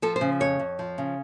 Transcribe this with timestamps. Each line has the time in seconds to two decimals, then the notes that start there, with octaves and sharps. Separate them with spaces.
0.02 F3 A4
0.16 C5
0.21 C#3
0.40 F2 C#5
0.59 F2
0.79 F3
0.98 C#3